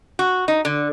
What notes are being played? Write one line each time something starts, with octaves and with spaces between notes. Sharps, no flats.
F#4
D#4
D3